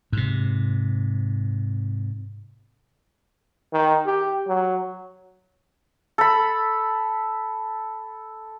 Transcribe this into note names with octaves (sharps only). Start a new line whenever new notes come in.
G#2 C3
D#3
G4
F#3
A4 B5